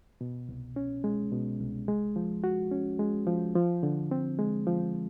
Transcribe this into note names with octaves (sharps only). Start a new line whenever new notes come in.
B2
C2
C#4
G#3
B2
C2
G#3
F3
F#4
C#4
G#3
F3
F3
D3
C4
G#3
F3